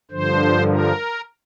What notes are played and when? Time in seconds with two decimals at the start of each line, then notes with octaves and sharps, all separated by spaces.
0.11 G2 D3 F3 C5
0.69 A#4